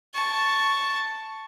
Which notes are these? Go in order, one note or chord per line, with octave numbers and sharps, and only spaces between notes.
A5 C#6